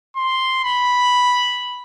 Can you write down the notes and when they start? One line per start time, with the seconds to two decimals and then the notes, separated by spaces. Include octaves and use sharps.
0.16 C6
0.64 B5